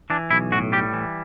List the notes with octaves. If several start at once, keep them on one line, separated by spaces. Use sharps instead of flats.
E3 D4
B1 E4
A2 F#4
G3 G4
E3